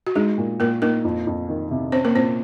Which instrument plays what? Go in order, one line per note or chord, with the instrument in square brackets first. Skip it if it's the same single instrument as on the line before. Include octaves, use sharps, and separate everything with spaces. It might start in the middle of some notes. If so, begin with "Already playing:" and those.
[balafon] F#4
[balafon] G#3 G#4 [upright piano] D#4
[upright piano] A#2
[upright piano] A#2 [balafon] A#3 A#4
[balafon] A#3 A#4 [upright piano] D#4
[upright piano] F2
F2
D#3
C3
[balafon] C4 C5 [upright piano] C#4
[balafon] A#3 A#4
[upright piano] A#2 [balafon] C4 C5